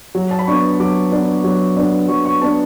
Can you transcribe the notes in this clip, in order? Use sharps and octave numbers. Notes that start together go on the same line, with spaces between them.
F#3
A5
B5
B3 D4 C#6
F#3 D6
B3 D4
F#3
B3 D4
F#3 C#6
C#6
B3 D4 A5